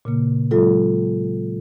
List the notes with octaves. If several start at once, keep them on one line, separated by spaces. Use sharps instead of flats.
A#2 C#3 A#3
F#3 G#3 F4 A4